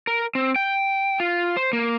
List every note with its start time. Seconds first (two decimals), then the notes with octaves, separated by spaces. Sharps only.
0.07 A#4
0.35 C4
0.56 G5
1.20 F4
1.57 C5
1.73 A#3